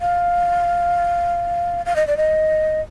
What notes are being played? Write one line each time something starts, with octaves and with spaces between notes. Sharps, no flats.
F5
F5
D#5
D5
D#5